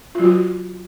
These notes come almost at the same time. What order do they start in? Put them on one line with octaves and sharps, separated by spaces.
F4 F#3 F#4